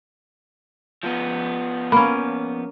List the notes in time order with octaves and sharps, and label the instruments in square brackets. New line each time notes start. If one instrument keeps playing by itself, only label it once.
[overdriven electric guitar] F3 B3
[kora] A#3 C#4 [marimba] B5